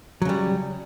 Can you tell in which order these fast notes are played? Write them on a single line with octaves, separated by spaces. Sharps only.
F#3 C#3 G3